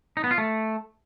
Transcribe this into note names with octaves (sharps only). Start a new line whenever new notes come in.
D#4
B3
F4
A3